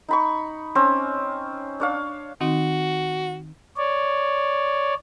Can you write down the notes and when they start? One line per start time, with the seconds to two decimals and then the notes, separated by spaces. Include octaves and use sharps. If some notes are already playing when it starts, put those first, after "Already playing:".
0.08 D#4 B5 C#6
0.75 C4 C#4 C5
1.80 D4 C#5 F5
2.41 D#3 C4 D#4 F#4
3.77 C#5 D5